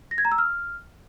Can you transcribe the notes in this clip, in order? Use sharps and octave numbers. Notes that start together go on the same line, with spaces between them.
A#6
G#6
A#5
E6
F6